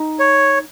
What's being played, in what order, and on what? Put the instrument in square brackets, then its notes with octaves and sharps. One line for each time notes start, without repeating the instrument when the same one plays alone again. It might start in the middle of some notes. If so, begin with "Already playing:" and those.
Already playing: [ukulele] D#4
[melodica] C#5